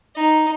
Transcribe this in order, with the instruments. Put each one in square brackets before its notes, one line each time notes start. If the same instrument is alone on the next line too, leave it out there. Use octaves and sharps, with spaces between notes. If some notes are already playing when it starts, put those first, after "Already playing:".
[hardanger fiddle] D#4